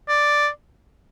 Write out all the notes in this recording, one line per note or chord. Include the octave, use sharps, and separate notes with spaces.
D5